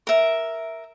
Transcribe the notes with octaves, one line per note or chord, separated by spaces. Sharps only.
A#4 E5